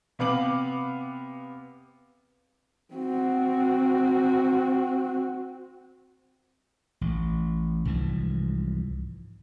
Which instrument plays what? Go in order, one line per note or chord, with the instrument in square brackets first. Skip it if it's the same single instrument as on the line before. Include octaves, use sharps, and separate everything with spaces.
[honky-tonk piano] C3 B3 F5 D6 F#7
[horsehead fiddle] C4 F#4
[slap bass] A1
C2 G#2 E3 F3